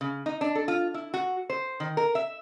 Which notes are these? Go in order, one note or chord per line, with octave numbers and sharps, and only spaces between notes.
C#3
D#4
D4
A4
F4
E4
F#4
C5
D#3
A#4
E5